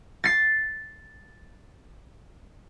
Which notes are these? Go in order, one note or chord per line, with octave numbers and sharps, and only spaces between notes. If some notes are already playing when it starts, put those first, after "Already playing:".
A6 C7